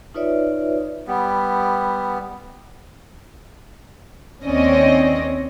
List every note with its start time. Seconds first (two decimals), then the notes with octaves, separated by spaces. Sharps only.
0.14 D#4 F4 B4 C#5 D5 E5
1.08 G3 B3
4.46 D#2 C4 C#4 D5 D#5